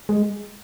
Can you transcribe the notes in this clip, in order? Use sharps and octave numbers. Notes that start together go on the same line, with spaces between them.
G#3